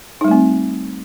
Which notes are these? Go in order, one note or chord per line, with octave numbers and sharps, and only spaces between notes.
G3 A3 C4 D#4